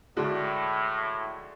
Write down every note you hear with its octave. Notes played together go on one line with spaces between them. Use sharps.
A2 D3 G#3 D4 F#4